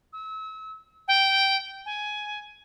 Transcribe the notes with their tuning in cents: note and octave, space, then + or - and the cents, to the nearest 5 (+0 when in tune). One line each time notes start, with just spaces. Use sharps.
E6 -35
G5 -10
G#5 +10